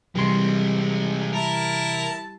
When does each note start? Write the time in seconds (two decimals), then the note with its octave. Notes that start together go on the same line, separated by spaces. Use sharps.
0.15 C3 E3 G3 G#3 C4 C6
1.33 E4 A#4 A5